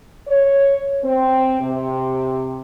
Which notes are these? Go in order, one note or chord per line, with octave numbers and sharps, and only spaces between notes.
C#5
C4
C3